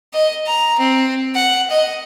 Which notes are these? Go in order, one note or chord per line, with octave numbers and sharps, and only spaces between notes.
D#5
A#5
C4
F#5
D#5